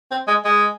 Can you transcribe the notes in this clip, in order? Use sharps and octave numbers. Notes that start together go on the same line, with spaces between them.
C4
G#3
G#3